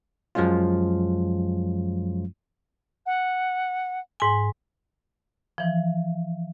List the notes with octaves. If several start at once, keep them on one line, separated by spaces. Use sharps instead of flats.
F#2 F3 F#3 G#3 C#4 F4
F#5
G#2 G#5
E3 F3